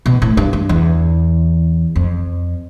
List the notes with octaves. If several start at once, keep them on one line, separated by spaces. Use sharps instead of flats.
B2
A2
G2
G2
E2
F2